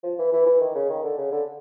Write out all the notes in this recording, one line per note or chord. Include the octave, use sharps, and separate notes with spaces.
F3
E3
E3
E3
D#3
C#3
D#3
D3
C#3
D3